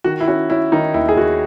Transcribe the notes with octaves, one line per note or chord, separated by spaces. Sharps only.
D#3 F#4
E4
C#4 F#4
C#4 E4
D#3 D#4
D#2 E4
G#4
D#2 F#4